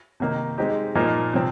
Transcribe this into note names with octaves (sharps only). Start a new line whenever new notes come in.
C3 D#3 A#3 D#4
G#3 C4 D#4 G4
A#2 F3 A#3 D#4
C3 F3 C4